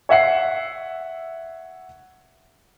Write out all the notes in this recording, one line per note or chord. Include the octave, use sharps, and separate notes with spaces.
C#5 E5 F#5 C7